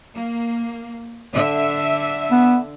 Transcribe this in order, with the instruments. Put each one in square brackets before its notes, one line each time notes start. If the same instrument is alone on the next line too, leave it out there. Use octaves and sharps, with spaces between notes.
[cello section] A#3
D3 E5
[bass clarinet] B3